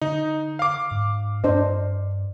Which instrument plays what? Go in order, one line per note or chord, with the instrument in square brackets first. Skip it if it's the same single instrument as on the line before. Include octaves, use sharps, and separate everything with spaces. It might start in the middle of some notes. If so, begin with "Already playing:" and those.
[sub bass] D3 [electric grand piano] D#4
[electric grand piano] F5 D6
[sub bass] G#2
[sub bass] G2 [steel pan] D4 C5 D#5